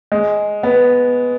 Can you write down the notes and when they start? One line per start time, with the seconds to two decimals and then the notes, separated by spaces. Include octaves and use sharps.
0.12 G#3
0.63 B3